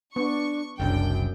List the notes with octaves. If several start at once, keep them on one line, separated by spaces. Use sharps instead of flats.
B3 D4 C#6
F#1 C2 F#2 D4 G5